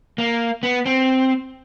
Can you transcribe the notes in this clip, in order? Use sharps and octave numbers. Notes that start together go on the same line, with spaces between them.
A#3
B3
C4